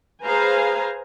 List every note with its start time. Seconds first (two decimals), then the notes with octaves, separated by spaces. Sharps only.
0.25 G#4 B4 C5 F5 G#5 A#5